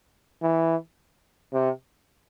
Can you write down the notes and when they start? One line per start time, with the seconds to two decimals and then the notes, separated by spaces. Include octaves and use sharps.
0.42 E3
1.53 C3